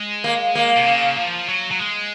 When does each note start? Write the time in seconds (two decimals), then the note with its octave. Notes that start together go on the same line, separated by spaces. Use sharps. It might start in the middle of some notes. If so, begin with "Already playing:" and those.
Already playing: G#3
0.24 A#3
0.55 A#3
0.77 C3
0.86 C#3
1.17 F3
1.49 F#3
1.71 F#3
1.79 G#3